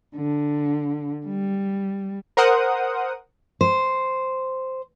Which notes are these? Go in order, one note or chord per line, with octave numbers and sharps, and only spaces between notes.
D3
G3
A#4 C5 F#5 D#6
C5